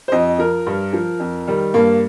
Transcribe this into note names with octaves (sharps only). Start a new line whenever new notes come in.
C5
F2 D#5
F3 A#4
G2
F3
F2
D#3 G3
G2 A#3